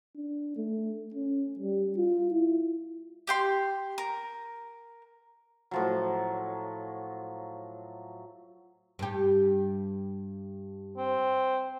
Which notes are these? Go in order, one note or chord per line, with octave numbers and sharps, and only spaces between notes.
D4
A3
C#4
G3
F4
E4
G4 G5 C6
A#4
A2 F3 F#3
G2 G4
C4